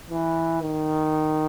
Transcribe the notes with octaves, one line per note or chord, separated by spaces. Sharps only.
E3
D#3